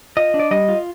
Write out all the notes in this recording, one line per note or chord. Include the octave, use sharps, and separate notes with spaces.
F4 D#5
D4
D5
G3 D#5
F4